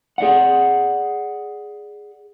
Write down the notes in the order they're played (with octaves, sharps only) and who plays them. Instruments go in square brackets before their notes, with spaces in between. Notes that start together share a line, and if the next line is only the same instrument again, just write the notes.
[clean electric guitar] G#4 D5 F#5